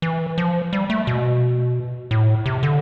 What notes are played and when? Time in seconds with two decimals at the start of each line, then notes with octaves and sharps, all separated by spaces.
0.02 E3
0.38 F3
0.73 G3
0.90 A3
1.07 B2
2.11 A2
2.46 C3
2.63 D3